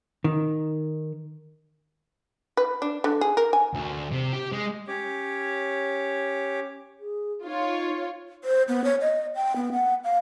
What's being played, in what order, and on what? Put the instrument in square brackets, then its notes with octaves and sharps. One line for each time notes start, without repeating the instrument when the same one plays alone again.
[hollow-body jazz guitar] D#3
[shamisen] B4
D4
D3
G#4
A#4
G#5
[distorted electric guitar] D2
C3
G4
G#3
[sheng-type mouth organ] C#4 G4 C#5 D6
[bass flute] G#4
[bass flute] D#4 [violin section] F4 C#5
[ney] C5
B3
C#5
D#5
G5
B3
F#5
F5